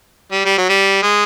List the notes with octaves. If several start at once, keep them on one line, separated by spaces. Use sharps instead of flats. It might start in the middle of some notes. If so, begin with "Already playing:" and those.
G3
G3
F#3
G3
G#3